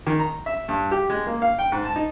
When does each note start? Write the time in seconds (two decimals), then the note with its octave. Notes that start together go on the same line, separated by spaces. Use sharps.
0.07 D#3
0.19 A#5
0.46 E5
0.69 G2
0.91 G4
1.10 G#3
1.27 A#3
1.42 F5
1.59 G5
1.72 G#2
1.84 A5
1.96 D#4